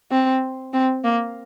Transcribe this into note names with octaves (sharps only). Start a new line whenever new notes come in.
C4
C4
A#3